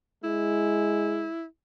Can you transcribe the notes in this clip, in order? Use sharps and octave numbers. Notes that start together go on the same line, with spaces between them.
G#3 E4